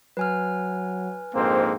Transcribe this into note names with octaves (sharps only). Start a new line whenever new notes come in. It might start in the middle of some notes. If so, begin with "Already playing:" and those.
F#3 B4 G#5 F6
A#1 F2 G#2 A#3 C4 C5